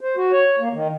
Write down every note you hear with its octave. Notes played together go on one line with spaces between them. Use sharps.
C5
F#4
C#5
A#3
D#3